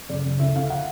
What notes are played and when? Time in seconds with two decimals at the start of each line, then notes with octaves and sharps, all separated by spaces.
0.09 F#1 D5
0.25 F#1
0.40 D2 E5
0.56 D2 F5
0.70 F#5